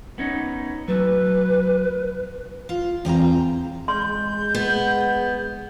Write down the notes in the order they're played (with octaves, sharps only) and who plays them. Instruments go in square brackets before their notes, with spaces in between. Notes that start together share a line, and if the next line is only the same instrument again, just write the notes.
[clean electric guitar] B3 C#4 D#4
[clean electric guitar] F#3 A3 [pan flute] B4
[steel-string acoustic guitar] F4
E2 C4 F4 A#5
[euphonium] G#3 [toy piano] C6 [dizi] G6
[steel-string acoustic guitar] B3